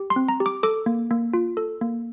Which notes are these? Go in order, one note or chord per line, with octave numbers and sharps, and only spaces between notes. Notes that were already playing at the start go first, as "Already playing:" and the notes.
Already playing: G4
C6
C4
A#5
G4
D6
A4 D6
A#3
A#3
F4
A4
A#3